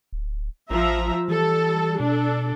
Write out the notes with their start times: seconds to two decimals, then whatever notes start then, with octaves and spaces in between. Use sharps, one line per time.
0.13 D1
0.70 A1 F3 E5 A#5
1.28 E3 G3 A4
2.00 B2 D4 A4